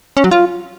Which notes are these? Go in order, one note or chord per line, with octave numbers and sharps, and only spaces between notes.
C#4
F#3
F4